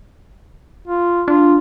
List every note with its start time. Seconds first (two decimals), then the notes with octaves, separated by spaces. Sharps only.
0.88 F4
1.28 D4 F4